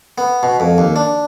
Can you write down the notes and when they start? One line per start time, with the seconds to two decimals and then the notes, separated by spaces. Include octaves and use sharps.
0.18 B3
0.43 B2
0.60 F2
0.78 D#2
0.96 D4